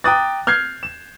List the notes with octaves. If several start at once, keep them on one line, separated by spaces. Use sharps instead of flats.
G5 A#5 D6 D#6 F#6 A6
F6 G6 G#6 C7
E7